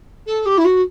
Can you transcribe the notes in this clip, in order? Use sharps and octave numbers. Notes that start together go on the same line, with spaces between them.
A4
G4
E4
F#4